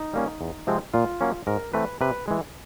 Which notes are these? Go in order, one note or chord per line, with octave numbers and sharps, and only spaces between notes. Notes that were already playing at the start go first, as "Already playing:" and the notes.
Already playing: D#4
G3 A#3 C#4
E2
C3 F3 G#3 C4
A#2 F4
F#3 A#3 C#4
G#2 A#4
E3 A3 C4 B4
C3 B4
E3 G#3